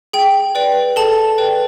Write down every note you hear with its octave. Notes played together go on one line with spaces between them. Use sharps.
G#4 G5
B4 D5 G5
G#4 A4 A5
B4 D5 G5